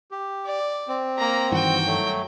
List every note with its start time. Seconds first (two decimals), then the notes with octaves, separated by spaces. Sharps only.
0.11 G4
0.46 D5
0.88 C4
1.18 A#3 A#5
1.52 G2 D#3 E3 F#4 G5
1.87 F#3 A3